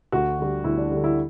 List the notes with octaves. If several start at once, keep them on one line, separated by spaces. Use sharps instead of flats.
D2 F#4
D3 G3
D2 E4
D4
D3 G3
E4